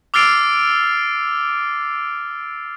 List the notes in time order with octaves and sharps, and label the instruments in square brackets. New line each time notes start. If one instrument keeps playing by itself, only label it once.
[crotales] D6 E6 F6 A6 C7 D7